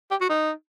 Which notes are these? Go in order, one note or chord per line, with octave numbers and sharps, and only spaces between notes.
G4
F#4
D#4